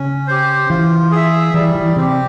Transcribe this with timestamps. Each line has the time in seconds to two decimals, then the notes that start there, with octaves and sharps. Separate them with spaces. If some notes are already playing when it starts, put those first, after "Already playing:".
Already playing: C#3 C#4
0.27 G4 C5
0.69 E3 F4
1.11 G#4
1.16 E5
1.54 E3 G3
1.75 E3
1.96 C3 C4 G4